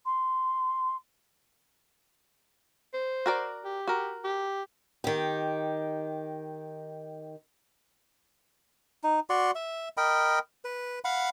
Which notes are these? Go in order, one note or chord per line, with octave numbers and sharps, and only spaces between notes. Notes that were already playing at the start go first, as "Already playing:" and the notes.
C6
C5
F#4 A#4 D5
G4
F#4 A#4
G4
D#3 G4
D#4
F#4 D5 C6 C#6
E5
A#4 D#5 G5 B5
B4
F5 F#5 B5